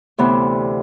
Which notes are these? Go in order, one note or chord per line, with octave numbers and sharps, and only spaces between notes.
D2 C3 E3 B3 E4